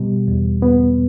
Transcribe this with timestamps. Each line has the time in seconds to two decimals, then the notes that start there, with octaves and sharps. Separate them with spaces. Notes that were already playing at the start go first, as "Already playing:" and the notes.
Already playing: B2 G3
0.28 E2
0.62 B3